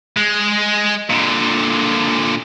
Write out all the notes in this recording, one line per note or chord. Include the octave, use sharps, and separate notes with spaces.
G#3
A#2 D3